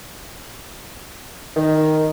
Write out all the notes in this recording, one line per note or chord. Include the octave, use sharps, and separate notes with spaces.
D#3